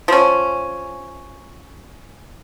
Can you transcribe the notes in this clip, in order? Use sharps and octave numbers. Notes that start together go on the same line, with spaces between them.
F3 C#4